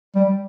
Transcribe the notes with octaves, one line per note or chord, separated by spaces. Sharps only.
G3